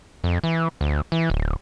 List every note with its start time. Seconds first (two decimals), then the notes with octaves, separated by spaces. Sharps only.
0.24 F2
0.44 E3
0.81 D2
1.12 E3
1.30 D1